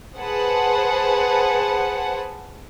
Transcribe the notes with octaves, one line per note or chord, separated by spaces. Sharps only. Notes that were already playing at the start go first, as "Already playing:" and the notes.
G#4 B4 C5 F#5 A5